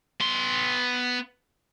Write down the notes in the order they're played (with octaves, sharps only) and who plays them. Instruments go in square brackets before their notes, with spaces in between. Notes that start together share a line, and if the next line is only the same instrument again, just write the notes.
[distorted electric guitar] B3 C6